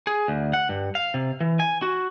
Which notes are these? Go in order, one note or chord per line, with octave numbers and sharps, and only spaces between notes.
G#4
D2
F#5
G2
F5
C3
E3
G#5
F#4